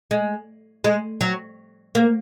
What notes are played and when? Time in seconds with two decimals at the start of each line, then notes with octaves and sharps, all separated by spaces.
0.11 G#3
0.84 G#3
1.21 F#3
1.95 A#3